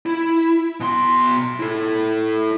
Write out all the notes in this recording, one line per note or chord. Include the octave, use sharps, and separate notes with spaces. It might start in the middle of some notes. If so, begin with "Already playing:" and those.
E4
B2 C6
E4 A4